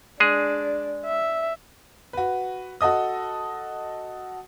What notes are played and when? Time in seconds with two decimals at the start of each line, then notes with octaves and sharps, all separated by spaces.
0.20 G#3 D4 G#4
1.05 E5
2.13 F#4 B4
2.81 F#4 A4 D#5 D#6